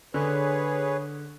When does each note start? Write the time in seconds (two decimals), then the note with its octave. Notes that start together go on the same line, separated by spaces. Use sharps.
0.14 D3 G#4 B4 C#5